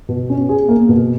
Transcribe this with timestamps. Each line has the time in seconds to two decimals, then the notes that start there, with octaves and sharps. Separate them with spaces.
0.09 B2
0.30 C#4
0.49 G#4
0.69 A#3
0.89 B2